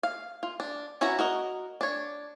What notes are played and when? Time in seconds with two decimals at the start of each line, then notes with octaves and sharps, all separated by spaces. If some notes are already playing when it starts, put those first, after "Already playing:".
0.03 F5
0.43 F4
0.60 D4
1.01 C#4 E4 F#4 B4 A#5
1.19 F#4 A#4 D#5
1.81 D4 C#5